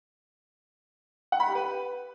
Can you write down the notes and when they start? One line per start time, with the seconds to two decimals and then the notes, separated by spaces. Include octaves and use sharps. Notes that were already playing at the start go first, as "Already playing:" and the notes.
1.32 F#5
1.40 B5
1.48 G4
1.55 B4